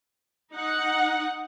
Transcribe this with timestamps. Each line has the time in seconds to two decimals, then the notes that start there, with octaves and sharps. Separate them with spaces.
0.55 D#4 F#5